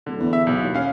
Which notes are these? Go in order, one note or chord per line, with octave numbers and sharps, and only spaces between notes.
D1 D3
E2
E5
B1
D#2
C#4 F5